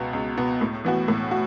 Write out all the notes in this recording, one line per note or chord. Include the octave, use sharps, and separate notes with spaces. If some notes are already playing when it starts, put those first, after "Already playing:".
Already playing: C#2 B2 B3
C#2
B2 B3
A2
E3 B3 F#4
A2
F#4